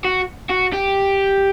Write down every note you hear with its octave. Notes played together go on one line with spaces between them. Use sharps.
F#4
F#4
G4